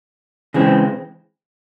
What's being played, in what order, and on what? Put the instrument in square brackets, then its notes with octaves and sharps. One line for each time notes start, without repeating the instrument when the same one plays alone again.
[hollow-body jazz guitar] C#3 E3 G#3 C4